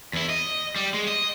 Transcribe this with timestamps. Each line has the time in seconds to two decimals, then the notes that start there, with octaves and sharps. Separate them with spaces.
0.13 E2 E4
0.29 D#5
0.76 G3
0.94 G#3
1.08 D#5